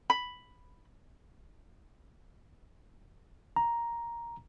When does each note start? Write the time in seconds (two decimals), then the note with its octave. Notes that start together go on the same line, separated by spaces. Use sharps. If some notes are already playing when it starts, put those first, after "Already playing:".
0.10 B5
3.56 A#5